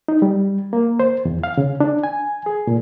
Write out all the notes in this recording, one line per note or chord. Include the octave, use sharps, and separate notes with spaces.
D#4
G3
A#3
C5
E2
F5
C#3
D4
G#5
G#4
A#2